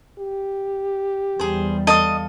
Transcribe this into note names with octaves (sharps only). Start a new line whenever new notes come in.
G4
E2 G3 G#4 C5
A4 D#5 F5 D#6